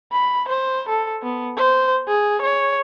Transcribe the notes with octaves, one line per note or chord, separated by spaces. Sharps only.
B5
C5
A4
B3
C5
G#4
C#5